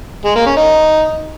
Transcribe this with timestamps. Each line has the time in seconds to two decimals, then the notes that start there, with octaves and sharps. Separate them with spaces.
0.25 G#3
0.35 A#3
0.46 C#4
0.57 D#4